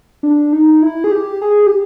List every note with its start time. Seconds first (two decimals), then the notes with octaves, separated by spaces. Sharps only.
0.23 D4
0.53 D#4
0.82 E4
1.04 G#4
1.12 G4
1.42 G#4
1.67 G4